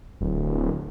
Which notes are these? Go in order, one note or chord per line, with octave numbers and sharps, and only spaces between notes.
D1